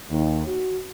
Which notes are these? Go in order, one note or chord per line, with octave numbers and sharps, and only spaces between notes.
D#2
F#4